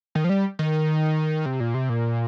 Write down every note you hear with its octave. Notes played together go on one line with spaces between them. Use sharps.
D#3
F3
G3
D#3
C3
A#2
C3
A#2